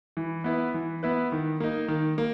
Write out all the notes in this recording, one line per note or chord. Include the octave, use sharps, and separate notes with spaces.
E3
B3 E4 B4
E3
B3 E4 B4
D#3
A#3 D#4
D#3
A#3